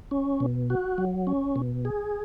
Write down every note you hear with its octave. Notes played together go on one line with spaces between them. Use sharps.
C#4
B2
F#4
F#3
C#4
B2
G#4